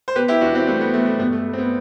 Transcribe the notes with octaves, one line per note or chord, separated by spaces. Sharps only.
C5
B2 G4 B4
E4 G4
E2 D4 F#4
C4 E4
G3 A3 C4
B3
B2 A3
B3
G2 B3
A3
G3
C4
B3